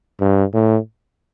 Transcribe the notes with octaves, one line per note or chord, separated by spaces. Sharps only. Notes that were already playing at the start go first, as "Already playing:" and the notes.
G2
A2